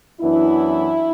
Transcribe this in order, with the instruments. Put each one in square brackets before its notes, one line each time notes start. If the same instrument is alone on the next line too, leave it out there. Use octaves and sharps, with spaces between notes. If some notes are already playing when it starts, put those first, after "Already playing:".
[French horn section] F#2 E3 B3 D4 E4